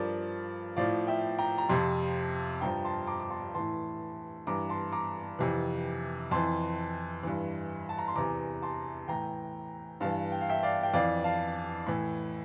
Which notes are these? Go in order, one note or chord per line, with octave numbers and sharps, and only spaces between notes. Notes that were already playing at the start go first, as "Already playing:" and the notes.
Already playing: G2 F3 A#4 D5
A2 F3 D5 F5
E5 G5
G5 A#5
A#5
F2 C3 F3 A5 C6
G2 F3 G5 A#5
A5 C6
A#5 D6
D6
A5 C6
A2 E3 A5 C6
G2 E3 A#5 D6
A5 C6
A#5 D6
F2 C3 E3
F2 E3 A5 C6
G2 E3
A5
A#5
C6
E2 C3 E3 A#5 D6
A5 C6
A2 E3 G5 A#5
G2 E3 F5 A5
G5
F5
E5 G5
D5 F5
G5
F2 E3 D5 F5
F5 A5
A2 E3